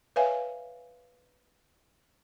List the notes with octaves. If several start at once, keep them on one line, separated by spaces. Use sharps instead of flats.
B4 C#5 E5 F5 G#5